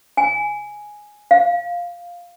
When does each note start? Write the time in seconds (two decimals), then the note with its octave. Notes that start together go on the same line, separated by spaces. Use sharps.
0.17 G#5
1.31 F5